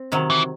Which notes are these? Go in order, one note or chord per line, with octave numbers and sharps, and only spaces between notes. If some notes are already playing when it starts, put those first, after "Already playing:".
Already playing: C4
C3 D#3 F#3
E3